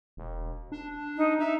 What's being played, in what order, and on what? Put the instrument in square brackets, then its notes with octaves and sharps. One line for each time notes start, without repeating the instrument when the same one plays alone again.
[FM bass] E1
D4
[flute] D#4
[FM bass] D#4 [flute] E5